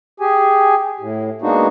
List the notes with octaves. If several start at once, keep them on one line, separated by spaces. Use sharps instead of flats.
G4 G#4 G#5
A2
G#3 A#3 B3 D4 D#4 F#4